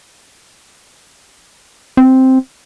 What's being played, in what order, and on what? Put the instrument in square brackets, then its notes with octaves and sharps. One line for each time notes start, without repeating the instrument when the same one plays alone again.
[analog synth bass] C4